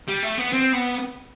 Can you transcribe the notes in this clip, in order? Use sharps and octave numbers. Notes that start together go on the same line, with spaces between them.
G3
A3
B3
C4
B3